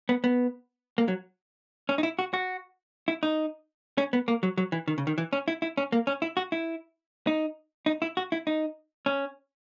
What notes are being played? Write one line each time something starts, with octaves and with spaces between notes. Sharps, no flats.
B3
B3
A#3
F#3
C#4
D#4
E4
F#4
F#4
E4
D#4
C#4
B3
A#3
F#3
F#3
E3
D#3
C#3
D#3
E3
C#4
E4
E4
C#4
A#3
C#4
E4
F#4
E4
D#4
D#4
E4
F#4
E4
D#4
C#4